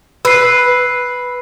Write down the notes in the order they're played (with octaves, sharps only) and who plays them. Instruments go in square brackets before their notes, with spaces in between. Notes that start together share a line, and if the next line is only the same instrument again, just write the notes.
[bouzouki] B4 [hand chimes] E6 C7